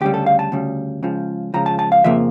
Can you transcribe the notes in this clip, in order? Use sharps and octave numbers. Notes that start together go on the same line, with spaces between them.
D2 C#3 G3 G4
A4
F5
A5
D2 C#3 G3
C#2 C#3 F3
C#2 C#3 F3 A#5
A5
A5
F5
F2 C#3 F3 A#3 E5